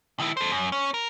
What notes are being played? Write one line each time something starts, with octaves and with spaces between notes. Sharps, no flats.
D#3 E4
A4 C5
F#2
C#4
A#4